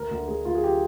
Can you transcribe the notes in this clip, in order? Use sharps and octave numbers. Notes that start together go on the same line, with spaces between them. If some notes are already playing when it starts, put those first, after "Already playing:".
Already playing: D2 A#4
D2
D2 G#4
D2 F4
G#4
G4